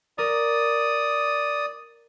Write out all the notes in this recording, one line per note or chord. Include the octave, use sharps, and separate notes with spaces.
A#4 D5 D#6